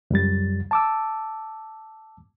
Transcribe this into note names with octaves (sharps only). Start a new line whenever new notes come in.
C#2 F#2 G3 A6
A5 D6 E6